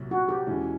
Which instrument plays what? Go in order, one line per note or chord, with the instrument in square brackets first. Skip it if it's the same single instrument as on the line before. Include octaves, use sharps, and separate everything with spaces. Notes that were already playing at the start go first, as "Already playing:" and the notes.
Already playing: [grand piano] C2 A#2 F#3
[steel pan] F#4
G4
[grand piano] E2 B2 G#3 C#4 E4